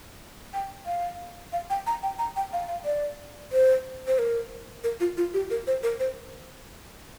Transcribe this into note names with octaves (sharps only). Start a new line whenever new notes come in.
G5
F5
F5
G5
A#5
G5
A#5
G5
F5
F5
D5
C5
C5
A#4
A#4
F4
F4
G4
A#4
C5
A#4
C5